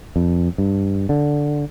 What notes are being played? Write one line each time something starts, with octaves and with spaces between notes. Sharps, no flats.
F2
G2
D3